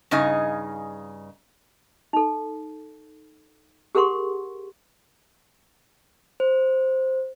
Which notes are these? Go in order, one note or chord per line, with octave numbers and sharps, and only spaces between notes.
G2 C#3 D#4 G#4 D#5 G#5
D#4 A4
G4 G#4 A#4 F#5 C6 C#6
C5